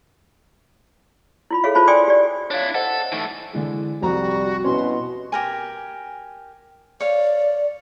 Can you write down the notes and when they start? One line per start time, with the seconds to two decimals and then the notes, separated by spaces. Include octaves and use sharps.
1.51 E4 F4 B5
1.64 G#4 A4 C#5 E5 F5
1.75 E4 F4 C5 A5 B5
1.87 D5 G5 G#5 C6 D6 D#6
2.08 G4 D5
2.51 D4 E4 C#5 F5
2.75 A4 C5 D#5 F#5
3.12 E3 A3 D#4
3.53 D3 E3 G#3
4.02 C2 F2 G3 F#4 A#5
4.64 B2 C#4 E4 B4 C6
5.32 G4 A#4 G#5
7.01 C#5 D5 F5